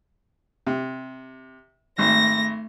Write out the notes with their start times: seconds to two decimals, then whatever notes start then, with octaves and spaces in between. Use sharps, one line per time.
0.67 C3
1.98 G#1 A3 A#6